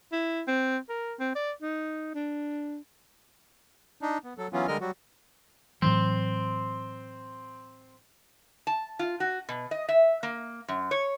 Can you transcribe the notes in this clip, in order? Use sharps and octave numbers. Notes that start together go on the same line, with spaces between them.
E4
C4
A#4
C4
D5
D#4
D4
D4 D#4
B3
F#3 A4
E3 F#3 B3 C#4 F4
D3 G3 G#3 A#4 D#5 F6
F#3 G3 F#4
A2 E3 F#3 C4
A5
F4
F#4
B2
D#5
E5
A#3
F#2
C#5